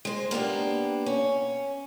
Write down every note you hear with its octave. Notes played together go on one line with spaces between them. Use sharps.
G#3 C5
A#3 B3 D4 G4
C#4